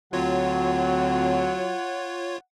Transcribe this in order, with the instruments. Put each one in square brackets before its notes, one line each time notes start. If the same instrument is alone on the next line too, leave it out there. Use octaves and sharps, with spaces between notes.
[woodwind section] D2 D3 C4 [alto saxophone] F#3 [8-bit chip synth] F4 C#5 [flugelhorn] F#5